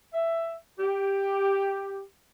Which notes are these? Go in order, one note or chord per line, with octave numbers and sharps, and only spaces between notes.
E5
G4